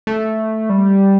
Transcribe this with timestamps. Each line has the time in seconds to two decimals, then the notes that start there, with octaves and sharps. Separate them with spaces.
0.07 A3
0.70 G3